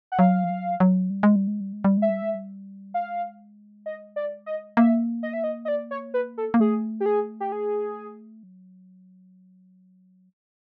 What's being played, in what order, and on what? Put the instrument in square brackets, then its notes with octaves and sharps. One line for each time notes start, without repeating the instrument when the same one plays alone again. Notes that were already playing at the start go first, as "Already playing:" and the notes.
[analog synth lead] F#5
[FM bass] F#3 [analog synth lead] F5
[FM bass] F3
F#3
F#3
G3
G#3
G3
G#3
G3
G#3
G3
[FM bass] G#3 [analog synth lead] E5
[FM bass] G3
G#3
G3
[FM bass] G#3 [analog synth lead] F5
[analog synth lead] D#5
D5
D#5
[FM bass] A#3 [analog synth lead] E5
[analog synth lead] D#5
E5
D#5
D#5
D5
C#5
B4
A4
[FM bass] A#3
[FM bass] A3 [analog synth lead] G#4
[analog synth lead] G4
G#4
G4
G#4
[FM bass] F#3